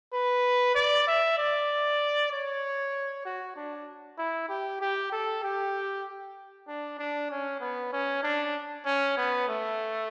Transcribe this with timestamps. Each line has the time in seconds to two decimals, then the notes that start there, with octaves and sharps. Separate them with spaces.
0.13 B4
0.75 D5
1.07 E5
1.38 D5
2.32 C#5
3.25 F#4
3.56 D4
4.19 E4
4.49 G4
4.81 G4
5.12 A4
5.44 G4
6.68 D4
6.99 D4
7.30 C#4
7.61 B3
7.93 C#4
8.23 D4
8.85 C#4
9.17 B3
9.48 A3